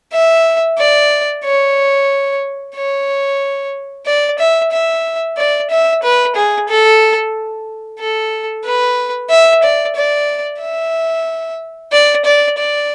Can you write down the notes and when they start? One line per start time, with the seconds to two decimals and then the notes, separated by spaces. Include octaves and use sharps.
0.13 E5
0.79 D5
1.44 C#5
2.75 C#5
4.07 D5
4.39 E5
4.72 E5
5.37 D5
5.70 E5
6.03 B4
6.36 G#4
6.69 A4
7.99 A4
8.65 B4
9.30 E5
9.63 D5
9.96 D5
10.61 E5
11.92 D5
12.25 D5
12.58 D5